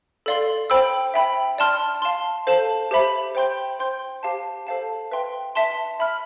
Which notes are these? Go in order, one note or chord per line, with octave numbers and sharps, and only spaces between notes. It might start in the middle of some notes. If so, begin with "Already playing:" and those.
A4 D5 F5 C6
C5 G5 B5 E6
E5 G5 B5
D5 A5 C6 F6
F5 A5 C6
A4 C5 F5 A5
G4 C5 E5 B5
C5 G5 C6 G6
C5 G5 C6 G6
G4 C5 F5 A5
A4 C5 F5 A5
B4 E5 G5 C6
E5 A5 C6
E5 B5 F6